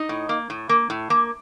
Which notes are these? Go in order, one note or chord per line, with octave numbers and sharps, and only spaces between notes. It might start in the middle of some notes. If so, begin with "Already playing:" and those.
Already playing: D#4 D#5
A2
A#3
A2
A#3
A2
A#3